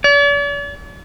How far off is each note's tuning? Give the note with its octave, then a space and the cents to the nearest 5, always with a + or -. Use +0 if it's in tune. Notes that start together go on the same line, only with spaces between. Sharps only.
D5 -45